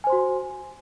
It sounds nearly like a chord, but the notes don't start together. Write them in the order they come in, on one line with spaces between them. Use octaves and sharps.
G#5 C5 C6 F#4